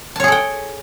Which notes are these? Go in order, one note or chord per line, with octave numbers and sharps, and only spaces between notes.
G#4 A4 C#5 G5 A5